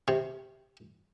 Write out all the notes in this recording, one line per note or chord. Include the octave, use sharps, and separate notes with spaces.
C3